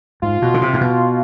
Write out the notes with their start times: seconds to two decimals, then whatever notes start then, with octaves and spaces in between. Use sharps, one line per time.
0.22 G#2 F4
0.42 B2
0.54 D3
0.61 C3
0.73 G#2
0.81 B2